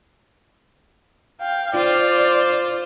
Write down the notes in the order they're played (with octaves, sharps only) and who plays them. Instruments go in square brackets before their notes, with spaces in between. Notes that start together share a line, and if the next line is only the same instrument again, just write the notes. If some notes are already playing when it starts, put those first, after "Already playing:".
[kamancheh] F5 G5
[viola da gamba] F4 C5 [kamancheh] D5